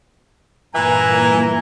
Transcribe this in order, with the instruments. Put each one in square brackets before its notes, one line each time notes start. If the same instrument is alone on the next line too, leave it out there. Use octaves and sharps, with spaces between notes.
[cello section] G2 A#2 A#4 [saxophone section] E3 [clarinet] G#5 [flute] A#5